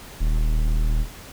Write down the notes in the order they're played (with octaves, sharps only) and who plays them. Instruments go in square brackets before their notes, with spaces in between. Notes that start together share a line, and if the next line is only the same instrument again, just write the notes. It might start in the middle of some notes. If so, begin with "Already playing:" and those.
[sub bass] D#1